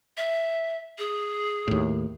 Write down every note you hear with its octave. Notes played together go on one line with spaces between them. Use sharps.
E5
G#4
D#2 A2